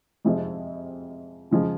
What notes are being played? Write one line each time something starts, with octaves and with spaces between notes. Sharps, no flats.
F2 C3 F3 G#3 C4
C#3 F3 G#3